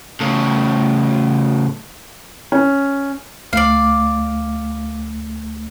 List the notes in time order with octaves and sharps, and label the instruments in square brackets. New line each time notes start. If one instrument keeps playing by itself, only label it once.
[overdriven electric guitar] A2 C#3
[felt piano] C#4
[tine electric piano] D2 A3 [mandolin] D5 F5